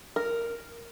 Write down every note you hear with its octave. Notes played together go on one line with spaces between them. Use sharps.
A#4